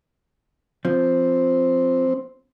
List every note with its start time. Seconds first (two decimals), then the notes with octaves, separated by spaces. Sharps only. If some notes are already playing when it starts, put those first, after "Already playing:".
0.85 F3 C4